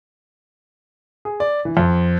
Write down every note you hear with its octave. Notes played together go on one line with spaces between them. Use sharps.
G#4
D5
E3
F2